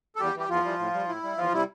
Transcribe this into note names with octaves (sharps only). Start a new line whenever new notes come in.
A4
E2 G3 G4
E3 G3 G4
E2 F3 F4
E3 G3
A2
G3
A2 E4
G3
E2 F3 F4
C3 G3 E4